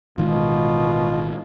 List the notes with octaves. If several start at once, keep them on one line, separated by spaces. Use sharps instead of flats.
A1 B2 D#3 G#3 F4